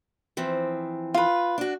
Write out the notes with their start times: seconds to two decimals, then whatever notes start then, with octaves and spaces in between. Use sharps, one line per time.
0.37 E3 F3 C4
1.14 F4 B4
1.58 D4 F#4